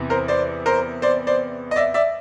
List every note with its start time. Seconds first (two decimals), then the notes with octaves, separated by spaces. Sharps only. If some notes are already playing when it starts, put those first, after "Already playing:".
Already playing: E2 C3 E3
0.10 A#4 C5
0.28 C5 D5
0.66 A#4 C5
1.02 C5 D5
1.27 C5 D5
1.71 D#5
1.76 D5 E5
1.94 D5 E5